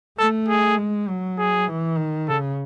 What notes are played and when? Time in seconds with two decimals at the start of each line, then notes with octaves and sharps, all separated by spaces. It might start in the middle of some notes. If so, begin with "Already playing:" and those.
0.18 A3 A4
0.48 G#4
0.77 G#3
1.08 F#3
1.38 G#4
1.68 E3
1.97 D#3
2.28 C#3 A4